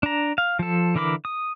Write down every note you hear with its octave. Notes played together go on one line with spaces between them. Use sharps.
D4 A#5
F5
F3 A4
D3 E3 A#4 B5 D6
D#6